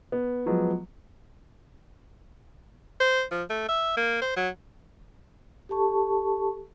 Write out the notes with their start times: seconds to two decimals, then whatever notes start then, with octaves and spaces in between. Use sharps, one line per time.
0.12 B3
0.46 F3 F#3 G#3 B3
3.01 C5
3.31 F3
3.50 A3
3.69 E5
3.97 A#3
4.22 C5
4.37 F#3
5.69 G4 A4 A5 C#6